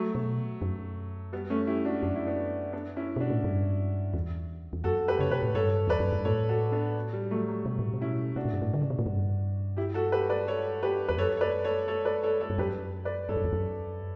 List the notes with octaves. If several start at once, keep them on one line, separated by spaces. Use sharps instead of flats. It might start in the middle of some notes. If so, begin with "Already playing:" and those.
Already playing: F#3 A3
B2
F#2
G3 B3
A3 C#4
E4 G4
D4 F#4
F#2 D4
E4
B3 D4
B3 D4
C#4 E4
B2 D4 F#4
A2
G2
E2
E2
F#2 F#4 A4
G4 B4
C#3 C#5
B2 G4 B4
A2
G2 A4 C#5
E2 B4 D5
F#2
G2
A2 A4 C#5
F#4 A4
B3 D4
G3
F#3 A3
F#3
B2 G3
A2
B2
C#4 E4
B2 D4 F#4
A2
G2
A2
D3
C#3
B2
A2
G2
E4 G4
F#4 A4
G4 B4
B4 D5
A4 C#5
G4 B4
E2 B4
F#2 A4 C#5
C#5
B4 D5
A4 C#5
A4 C#5
B4 D5
A4 C#5
A4 C#5
G2
F#2 G4 B4
B4 D5
G2 A4 C#5
F#2
E2
F#2